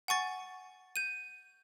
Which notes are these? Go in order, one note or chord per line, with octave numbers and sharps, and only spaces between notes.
F#5 G#5 C#6 A6
G6 D#7